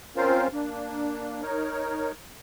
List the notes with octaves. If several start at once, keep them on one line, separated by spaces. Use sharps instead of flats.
C4 C#4 F4 A#4 C5 F5
A#3 D4
D#4 A#4 C#5